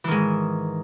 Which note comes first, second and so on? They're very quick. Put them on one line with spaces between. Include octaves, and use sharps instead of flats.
E3 D#3 G#2